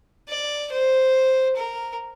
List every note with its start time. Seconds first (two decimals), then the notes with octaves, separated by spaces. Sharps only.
0.28 D5
0.71 C5
1.56 A#4